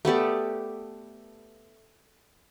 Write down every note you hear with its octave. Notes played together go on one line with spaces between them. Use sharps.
A3 B3 G4 D5